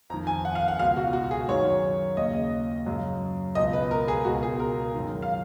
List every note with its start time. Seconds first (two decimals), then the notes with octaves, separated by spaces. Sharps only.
0.10 F2 A#5
0.14 D#3
0.27 G#5
0.45 F#5
0.55 F5
0.68 F#5
0.79 C#2 B2 F5
0.97 F#4
1.13 F#4
1.31 G#4
1.48 F#2 D#3 C#5
2.17 D#2 C#3 D#5
2.86 F#2 C#3
3.55 C#2 B2 D#5
3.73 B4
3.91 A#4
4.08 G#4
4.25 C#2 B2 F#4
4.43 G#4
4.60 A#4
4.94 F#2 D#3
5.22 F5